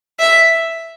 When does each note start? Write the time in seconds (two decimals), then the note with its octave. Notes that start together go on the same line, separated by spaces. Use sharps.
0.20 E5